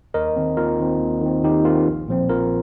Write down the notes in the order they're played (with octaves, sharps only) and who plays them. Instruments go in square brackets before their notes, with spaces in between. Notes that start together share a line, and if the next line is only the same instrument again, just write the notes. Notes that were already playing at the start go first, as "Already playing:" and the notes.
[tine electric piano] D#2 A#4 D#5
D#3 C4
D#2 F4 A#4
D#3 C4
D#2
D#3 C4
D#2 D#4 G4
D#3 C4 F4
A#1
A#2 F3 C4
A#1 F4 A#4